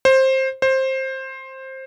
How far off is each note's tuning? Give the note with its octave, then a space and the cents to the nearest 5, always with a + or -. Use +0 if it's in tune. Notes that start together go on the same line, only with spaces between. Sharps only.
C5 +15
C5 +15